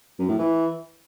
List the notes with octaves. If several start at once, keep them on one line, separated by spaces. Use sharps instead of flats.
F#2
A2
E3